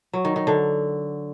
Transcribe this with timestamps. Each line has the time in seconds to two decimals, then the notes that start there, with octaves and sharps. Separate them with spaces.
0.13 F#3
0.25 D#3
0.36 D#3
0.47 D3